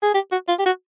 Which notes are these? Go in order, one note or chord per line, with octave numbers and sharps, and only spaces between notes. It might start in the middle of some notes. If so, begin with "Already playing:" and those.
G#4
G4
F#4
F4
G4
F#4